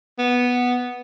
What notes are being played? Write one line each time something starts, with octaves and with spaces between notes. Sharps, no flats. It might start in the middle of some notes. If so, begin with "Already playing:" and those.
B3